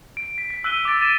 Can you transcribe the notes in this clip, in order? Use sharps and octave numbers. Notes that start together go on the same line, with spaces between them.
D7
B6
B6
E6 F#6 B6 D#7 G7
D6 E6 A6 D7
A6 D#7 E7